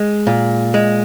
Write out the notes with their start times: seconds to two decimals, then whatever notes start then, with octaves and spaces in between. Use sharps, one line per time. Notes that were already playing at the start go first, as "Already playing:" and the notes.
Already playing: G#3
0.27 A#2
0.74 G#3